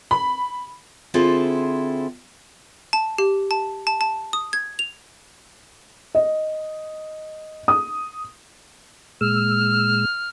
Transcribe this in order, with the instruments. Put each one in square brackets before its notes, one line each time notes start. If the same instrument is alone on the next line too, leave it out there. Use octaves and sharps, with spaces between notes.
[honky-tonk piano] B5
[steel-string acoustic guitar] D3 C4 E4 F4 G#4 A4
[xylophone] A5
G4
A5
A5
A5
D#6
G#6
F7
[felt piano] D#5
D#6
[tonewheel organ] A#2 G#3 E6 [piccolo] F6